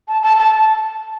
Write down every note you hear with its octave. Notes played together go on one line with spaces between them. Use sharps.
A5
A5
A5